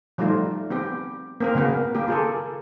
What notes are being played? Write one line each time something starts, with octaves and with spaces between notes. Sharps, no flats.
F3 G3 A3 D#4 F4
B3 C4 G4
A#3 C4 A#4
C#3 F#3 A#3 B3 A#4
A#3 G4
F4 G#4 A4